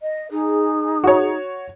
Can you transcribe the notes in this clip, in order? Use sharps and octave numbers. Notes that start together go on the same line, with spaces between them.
D#5
D#4 G#4
F#4 C#5